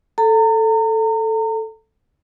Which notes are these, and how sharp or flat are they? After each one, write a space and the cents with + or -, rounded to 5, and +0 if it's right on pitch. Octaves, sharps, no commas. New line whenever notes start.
A4 +0 A#5 -35